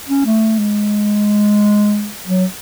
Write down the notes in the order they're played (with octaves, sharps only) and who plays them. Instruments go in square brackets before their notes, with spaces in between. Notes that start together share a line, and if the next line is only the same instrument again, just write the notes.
[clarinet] C#4
A3
G#3
F#3